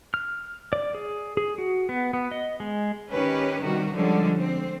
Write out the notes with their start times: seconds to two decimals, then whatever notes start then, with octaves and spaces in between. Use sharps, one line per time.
0.14 F6
0.73 D5
0.95 G#4
1.37 G#4
1.58 F#4
1.89 B3
2.13 B3
2.31 D#5
2.60 G#3
3.11 D#3 C#4 G4 B4
3.61 C3 D#3 G3 F#4
3.92 D3 F3 G3 G#3 C#4
4.37 C4